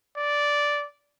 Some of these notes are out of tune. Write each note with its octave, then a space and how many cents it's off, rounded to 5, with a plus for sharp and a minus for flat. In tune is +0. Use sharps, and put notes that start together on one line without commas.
D5 -10